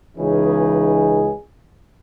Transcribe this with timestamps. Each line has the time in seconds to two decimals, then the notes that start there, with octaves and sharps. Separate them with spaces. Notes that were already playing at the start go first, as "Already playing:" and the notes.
0.17 C#2 E3 C#4 D#4 G#4 B4